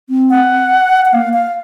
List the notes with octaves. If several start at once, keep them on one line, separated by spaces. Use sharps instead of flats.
C4
F#5
F#5
A#3 F5
F5